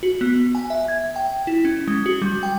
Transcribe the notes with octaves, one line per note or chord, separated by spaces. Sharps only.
F#4
B3
G#5
E5
G#6
G5
E4
C#4
G#3
F#4
G3
G5